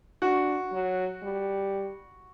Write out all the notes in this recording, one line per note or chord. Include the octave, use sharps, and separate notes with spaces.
D4 F#4
F#3
G3